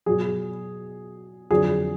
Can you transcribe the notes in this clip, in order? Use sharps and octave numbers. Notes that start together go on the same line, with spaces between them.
B2 F#3 G#4
F2 D3 F#3 G#4